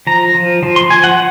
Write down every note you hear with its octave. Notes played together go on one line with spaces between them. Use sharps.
F3 A#5
F3
F3
C6
F3 G#5
F#5